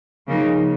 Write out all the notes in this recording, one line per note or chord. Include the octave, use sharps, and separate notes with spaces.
C#3 F3 A#3 D#4